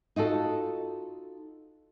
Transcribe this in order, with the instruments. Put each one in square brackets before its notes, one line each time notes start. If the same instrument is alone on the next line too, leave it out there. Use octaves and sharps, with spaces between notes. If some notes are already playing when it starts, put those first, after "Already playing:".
[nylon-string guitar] D#4 F4 F#4 A4